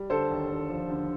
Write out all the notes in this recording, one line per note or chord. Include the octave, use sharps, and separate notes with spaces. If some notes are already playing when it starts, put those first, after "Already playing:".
Already playing: G3
D3 A4 C5
D#2
D#2
F3
D3